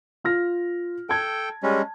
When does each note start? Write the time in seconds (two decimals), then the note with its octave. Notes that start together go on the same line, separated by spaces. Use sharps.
0.24 F4 F6 A#6
1.09 A4 G5 A5 G#6
1.63 G3 G#3 C#4